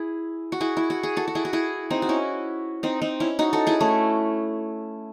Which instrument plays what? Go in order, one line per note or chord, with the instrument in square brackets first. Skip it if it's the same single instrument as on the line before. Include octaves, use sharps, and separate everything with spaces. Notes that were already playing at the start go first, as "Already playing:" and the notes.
Already playing: [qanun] E4 G#4
F#4
E4 G#4
E4
F#4
G#4
F#4 A4
F#4
E4 G#4
F#4
E4 G#4
C4 D#4
F#4
C#4 E4
C4 D#4
C4 D#4
C#4 E4
D#4 F#4
F#4 A4
E4 G#4
A3 C#4